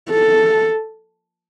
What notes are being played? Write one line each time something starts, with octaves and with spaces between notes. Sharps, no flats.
A4